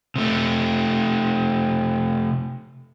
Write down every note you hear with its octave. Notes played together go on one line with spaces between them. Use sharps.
C3 A3